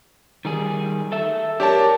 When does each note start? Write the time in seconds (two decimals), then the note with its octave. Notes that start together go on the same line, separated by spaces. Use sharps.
0.45 D#3 G3 G#4
1.12 A4 E5
1.60 D4 G4 A#4 C#5 A5